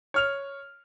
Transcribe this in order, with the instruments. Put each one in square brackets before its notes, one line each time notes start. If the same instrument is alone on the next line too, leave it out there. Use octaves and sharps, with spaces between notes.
[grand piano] C#5 F6 F7